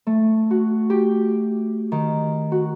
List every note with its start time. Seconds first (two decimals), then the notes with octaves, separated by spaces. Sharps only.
0.07 A3
0.51 F#4
0.90 G4
1.92 D#3
2.52 F#4